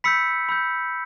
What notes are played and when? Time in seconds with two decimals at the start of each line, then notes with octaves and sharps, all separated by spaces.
0.04 B5 E6 G6 B6 C#7
0.49 B5 E6 G6